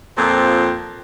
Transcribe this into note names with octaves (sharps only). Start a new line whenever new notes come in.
F2 A#2 C4